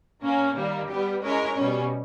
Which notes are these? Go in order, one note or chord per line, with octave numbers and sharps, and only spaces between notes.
A#2 A#3 C#4
D#3 G3 A#3
G3 B3 G4
G#3 C#4 E4 A#4 C#5
B2 G3 C#4